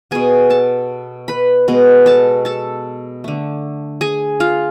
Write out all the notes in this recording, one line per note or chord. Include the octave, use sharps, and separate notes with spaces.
B2 B3 G#4 G#5
A4 A5
B4 B5
B2 G#3 B3
A4 A5
A4 A5
D3 A3
G#4 G#5
F4 F5